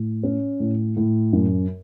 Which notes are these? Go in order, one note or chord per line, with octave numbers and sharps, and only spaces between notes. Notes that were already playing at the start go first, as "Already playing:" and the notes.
Already playing: A2
C#4
A2
A2
F#2